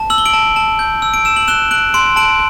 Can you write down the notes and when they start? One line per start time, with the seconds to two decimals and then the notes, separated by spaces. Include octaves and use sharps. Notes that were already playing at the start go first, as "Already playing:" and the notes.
Already playing: A5
0.10 E6 F#7
0.18 G7
0.25 D7 F#7
0.33 A5
0.56 A5
0.79 G6
1.02 E6
1.14 D7
1.25 E6 E7
1.36 F#7
1.48 F#6 E7 G7
1.71 F#6 D7 F#7
1.94 C6 D7 F#7
2.16 A5 D7 F#7